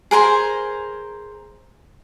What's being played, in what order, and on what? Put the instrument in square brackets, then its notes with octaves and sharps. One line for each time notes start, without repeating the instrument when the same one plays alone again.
[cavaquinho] G#4 A#4 C5 G#5